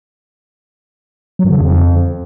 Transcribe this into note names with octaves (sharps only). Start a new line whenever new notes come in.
F#3
G2
D3
C#3
F2